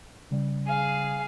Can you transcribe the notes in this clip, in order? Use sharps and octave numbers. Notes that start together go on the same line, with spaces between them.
C#3 G3
G#4 F5